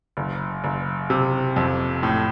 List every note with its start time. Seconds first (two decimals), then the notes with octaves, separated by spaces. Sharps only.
0.17 F#1
0.64 F#1
1.10 C3
1.56 F2
2.03 A2